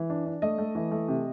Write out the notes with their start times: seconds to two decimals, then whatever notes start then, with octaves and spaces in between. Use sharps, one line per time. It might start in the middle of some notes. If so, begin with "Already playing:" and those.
Already playing: E3
0.10 D4
0.26 D4
0.42 A3 D#5
0.58 A3
0.75 E3
0.91 A3
1.08 C3